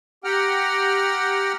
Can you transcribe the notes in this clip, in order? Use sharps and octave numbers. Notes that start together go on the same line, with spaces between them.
G4 F#5 G5 A#5 F6